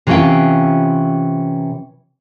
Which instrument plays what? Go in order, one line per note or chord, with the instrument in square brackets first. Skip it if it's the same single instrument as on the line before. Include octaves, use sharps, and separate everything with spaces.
[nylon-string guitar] C3 E3 C#4 F4 F5 G5